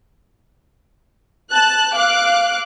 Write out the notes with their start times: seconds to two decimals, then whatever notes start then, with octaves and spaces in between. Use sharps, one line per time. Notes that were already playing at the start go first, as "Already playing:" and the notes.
1.51 A5 F#6
1.95 F5 D6 F#6